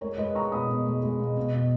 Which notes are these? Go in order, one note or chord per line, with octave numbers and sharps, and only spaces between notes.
G#3 A#4 C#5
G#3 B4 D#5
G#3 A#5 C#6
B2 B5 D#6
B2
G#3
G#3
B2
B2
B2